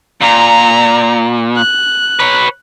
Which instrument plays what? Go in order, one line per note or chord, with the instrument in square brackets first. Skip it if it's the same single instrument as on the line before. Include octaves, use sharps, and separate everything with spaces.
[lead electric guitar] A#2 [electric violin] A#5
[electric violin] F#6
[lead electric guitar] B4 C#5